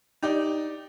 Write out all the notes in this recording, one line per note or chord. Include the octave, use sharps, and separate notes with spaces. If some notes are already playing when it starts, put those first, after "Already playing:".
D#4 G4 D5